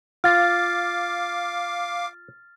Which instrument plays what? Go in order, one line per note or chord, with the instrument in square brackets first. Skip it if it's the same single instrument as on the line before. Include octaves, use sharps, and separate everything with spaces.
[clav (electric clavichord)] F4 [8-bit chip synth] F5 D6 [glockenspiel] F6 A6